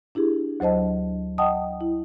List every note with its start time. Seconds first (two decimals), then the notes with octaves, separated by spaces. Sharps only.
0.15 D4 E4 G4 G#4
0.60 D2 F#3 C5 D#5 A5
1.38 D#5 F#5 G5 A5 D#6
1.81 E4